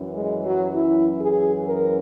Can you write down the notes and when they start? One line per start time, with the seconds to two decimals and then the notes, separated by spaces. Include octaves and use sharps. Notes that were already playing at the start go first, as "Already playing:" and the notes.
Already playing: F#2 E3
0.15 G#3
0.45 F#3
0.75 E4
1.21 G#4
1.65 A#4